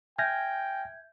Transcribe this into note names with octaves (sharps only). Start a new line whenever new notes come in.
E5 G5 G#5 F6 G6 G#6 A#6